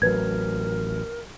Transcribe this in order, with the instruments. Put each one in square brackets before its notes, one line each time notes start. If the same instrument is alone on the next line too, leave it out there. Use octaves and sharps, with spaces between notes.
[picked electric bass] A1 F#3 [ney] A#4 [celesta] B4 G#6